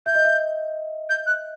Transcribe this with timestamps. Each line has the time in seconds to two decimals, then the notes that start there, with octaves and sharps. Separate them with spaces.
0.06 E5 G6
0.15 D#5
0.25 E5
1.09 G6
1.26 F#6